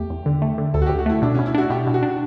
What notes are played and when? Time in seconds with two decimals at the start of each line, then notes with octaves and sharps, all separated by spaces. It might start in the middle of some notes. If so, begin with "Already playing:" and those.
Already playing: E2 A3 G4
0.10 E2
0.26 D3
0.42 A3
0.58 D3
0.74 D2 A4
0.82 F#4
0.86 D2 G4
0.99 F#4
1.06 A3 E4
1.22 B2 D4
1.35 B2 C#4
1.46 E4
1.55 D4 F#4
1.70 B2 G4
1.87 B2
1.94 F#4
2.03 D4